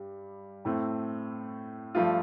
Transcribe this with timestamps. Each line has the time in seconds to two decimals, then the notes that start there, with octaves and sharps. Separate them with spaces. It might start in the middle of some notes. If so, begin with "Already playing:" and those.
Already playing: G2 G3
0.65 A2 A3 C4
1.95 G2 F3 A3 F4